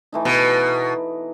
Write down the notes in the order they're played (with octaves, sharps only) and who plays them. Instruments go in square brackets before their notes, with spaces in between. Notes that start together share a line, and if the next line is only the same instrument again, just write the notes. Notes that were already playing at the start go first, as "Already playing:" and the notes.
[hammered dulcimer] E3 A3 D#4
[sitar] B2 [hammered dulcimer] B4
[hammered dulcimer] A#5